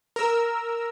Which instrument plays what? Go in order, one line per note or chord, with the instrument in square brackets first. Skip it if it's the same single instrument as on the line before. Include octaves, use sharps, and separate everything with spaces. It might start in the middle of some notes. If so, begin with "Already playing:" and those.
[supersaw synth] A#4 E6